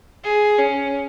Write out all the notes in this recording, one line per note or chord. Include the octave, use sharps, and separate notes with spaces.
G#4
C#4